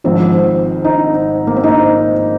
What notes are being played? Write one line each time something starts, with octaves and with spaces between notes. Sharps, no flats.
G#1 G#2 F3 C4
D#4
A#3
C4
D#4